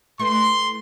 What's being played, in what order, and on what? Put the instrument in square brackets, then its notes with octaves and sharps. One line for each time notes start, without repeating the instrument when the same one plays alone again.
[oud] A3 E4 B4 [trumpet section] C6